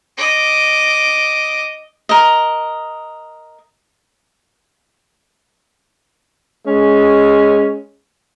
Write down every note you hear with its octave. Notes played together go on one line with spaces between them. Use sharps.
D#5 D6
A#4 D#5
G#3 C#4